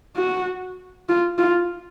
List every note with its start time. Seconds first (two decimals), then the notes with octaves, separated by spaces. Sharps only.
0.16 F#4
1.09 F4
1.38 F4